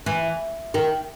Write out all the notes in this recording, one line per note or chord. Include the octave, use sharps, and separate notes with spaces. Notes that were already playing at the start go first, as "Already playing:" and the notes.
E3
D#3